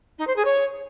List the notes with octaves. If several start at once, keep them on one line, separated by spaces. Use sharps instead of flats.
D#4
C5
G#4
C#5